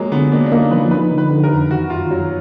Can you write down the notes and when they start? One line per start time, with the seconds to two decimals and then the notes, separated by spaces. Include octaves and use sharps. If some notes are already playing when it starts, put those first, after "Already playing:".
Already playing: F3 F#3 G#3 A#3
0.12 D3 B3
0.32 A#3 D4
0.46 D4
0.52 A#3 D#4
0.71 F3 B4
0.91 D#4 B4
1.11 D3
1.18 B4
1.31 D3
1.44 A#4
1.51 F2
1.70 D#3 F#4
1.90 F#2 F4
2.10 F#2 F#3